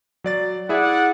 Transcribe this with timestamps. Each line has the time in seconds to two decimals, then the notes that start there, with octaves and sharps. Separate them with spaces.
0.24 F#3 D5 A6
0.69 E4 G#4 D5 E5 F#5